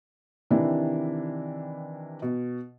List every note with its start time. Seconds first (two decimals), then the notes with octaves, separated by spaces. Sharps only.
0.51 C3 D#3 E3 D4 E4
2.22 B2